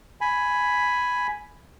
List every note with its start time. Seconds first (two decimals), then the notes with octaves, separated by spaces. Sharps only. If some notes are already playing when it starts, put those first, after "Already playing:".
0.21 G#5 B5